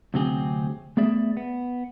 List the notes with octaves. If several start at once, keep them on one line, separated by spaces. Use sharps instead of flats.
D2 C3 F#3 C4 G4 G#4
A3 B3 G#4 D5 E5
B3